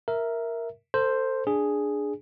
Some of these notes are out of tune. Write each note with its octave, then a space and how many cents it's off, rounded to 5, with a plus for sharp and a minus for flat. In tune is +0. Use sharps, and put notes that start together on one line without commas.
A#4 +0 E5 +0
A4 +35 C5 +0
D4 +0 G#4 +0